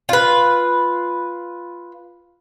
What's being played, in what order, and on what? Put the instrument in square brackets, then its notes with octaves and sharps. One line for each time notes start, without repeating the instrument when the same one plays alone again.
[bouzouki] F4 B4